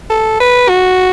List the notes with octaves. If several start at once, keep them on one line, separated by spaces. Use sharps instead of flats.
A4
B4
F#4